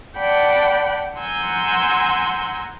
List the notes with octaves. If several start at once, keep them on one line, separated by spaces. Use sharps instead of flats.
D5 F#5 G5 A5 B5
F#5 G#5 A#5 C6 E6 G6